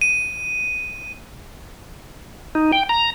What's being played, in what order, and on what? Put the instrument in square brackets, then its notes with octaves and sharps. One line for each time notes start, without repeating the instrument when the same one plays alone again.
[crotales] D#7
[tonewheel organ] D#4
G5
A#5